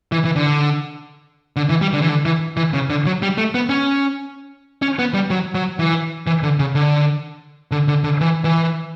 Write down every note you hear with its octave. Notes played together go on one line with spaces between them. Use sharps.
E3
E3
D3
D3
E3
G3
D3
E3
D3
E3
E3
C#3
D3
F#3
G3
A3
B3
C#4
C#4
B3
G3
F#3
F#3
E3
E3
D3
C#3
D3
D3
D3
D3
E3
E3